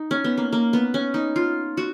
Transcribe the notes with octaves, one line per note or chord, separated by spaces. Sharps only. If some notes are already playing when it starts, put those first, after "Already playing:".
Already playing: D#4
C#4
B3
A#3
A#3
B3
C#4
D#4
F4
F#4